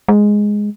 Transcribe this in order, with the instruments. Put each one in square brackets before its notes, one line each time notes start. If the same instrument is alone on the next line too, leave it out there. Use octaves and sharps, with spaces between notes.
[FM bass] G#3